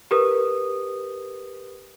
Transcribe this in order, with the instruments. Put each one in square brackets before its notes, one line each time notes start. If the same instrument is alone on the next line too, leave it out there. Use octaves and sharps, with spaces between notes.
[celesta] G4 A#4 B4 D#6